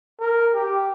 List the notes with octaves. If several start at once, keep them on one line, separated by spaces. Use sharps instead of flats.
A#4
G4